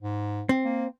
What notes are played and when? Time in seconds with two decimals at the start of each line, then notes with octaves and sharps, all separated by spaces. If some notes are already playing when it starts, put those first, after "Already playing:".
0.01 G#2
0.49 C4
0.65 A#3